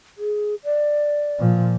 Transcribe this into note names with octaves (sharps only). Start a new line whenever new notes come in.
G#4
D5
A#2 F3